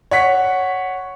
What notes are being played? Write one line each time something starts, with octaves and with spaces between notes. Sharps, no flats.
C#5 F#5 B6